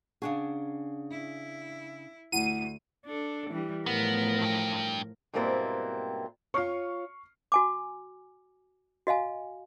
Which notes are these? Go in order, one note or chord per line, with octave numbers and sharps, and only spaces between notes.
C#3 D4 G#4 F#5 C#6
E4
D2 E4 F#5 D#7
D4 A4
E3 G3
A2 F3 B3 A#4
G2 G5
G#2 B2 G3 A#3 C4 E4
F4 C#5 C#6 F6 C7
F#4 G#5 D6
F#4 D#5 F5 G#5